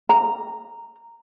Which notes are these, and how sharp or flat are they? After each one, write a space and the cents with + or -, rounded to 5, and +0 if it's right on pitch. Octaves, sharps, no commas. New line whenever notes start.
A#5 -10